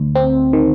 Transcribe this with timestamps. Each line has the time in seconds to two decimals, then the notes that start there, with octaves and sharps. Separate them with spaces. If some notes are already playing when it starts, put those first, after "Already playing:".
Already playing: D2
0.15 C4
0.53 D#3